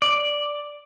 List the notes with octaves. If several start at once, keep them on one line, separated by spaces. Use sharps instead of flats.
D5